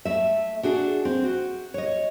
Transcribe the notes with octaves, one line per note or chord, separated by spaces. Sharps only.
A3 E5
D4 F#4 G#4 A4
C4
F#4
C#5 D#5